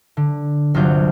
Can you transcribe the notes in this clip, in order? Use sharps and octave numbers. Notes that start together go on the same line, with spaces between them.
D3
G1 C2 F#3 G3 F4 G6